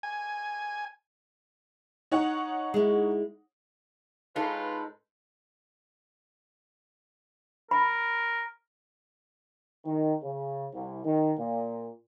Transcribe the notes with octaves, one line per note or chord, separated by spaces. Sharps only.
G#5
D#4 C#5 F#5
G#3 E4
G#2 G#3 C#4 D#4 F4 A4 B4
A#4 B5
D#3
C#3
C2
D#3
A#2